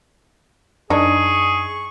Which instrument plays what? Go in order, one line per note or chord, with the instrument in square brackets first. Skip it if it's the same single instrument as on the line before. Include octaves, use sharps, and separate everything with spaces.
[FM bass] F#2 [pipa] D4 D#4 [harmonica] G#4 [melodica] C#6